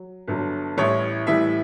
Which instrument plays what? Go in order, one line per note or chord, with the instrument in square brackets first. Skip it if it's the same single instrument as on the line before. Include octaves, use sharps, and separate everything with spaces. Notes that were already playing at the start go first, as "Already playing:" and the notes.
Already playing: [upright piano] F#3
G1 G2 F#3
A1 A2 E3 G3 C#5
A1 A2 E3 G3 E5